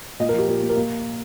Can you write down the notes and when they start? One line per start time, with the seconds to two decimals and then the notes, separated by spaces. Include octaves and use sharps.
0.20 A#2 D#5
0.29 A#4
0.33 F3
0.38 G4
0.48 A#2 A#4
0.62 A#3
0.69 A#4
0.76 A#3